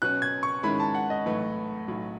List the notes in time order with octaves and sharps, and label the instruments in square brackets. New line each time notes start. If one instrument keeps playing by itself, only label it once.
[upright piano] B2 F#3 C#4 [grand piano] F#6
[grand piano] G#6
C#6
[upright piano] G#2 D#3 G#3 C#4 E4 [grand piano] B5
[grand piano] A5
F#5
D#5
[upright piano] B1 A2 E3 A3
B1 A2 F#3